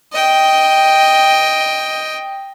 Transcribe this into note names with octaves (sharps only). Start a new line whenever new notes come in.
D#5 G5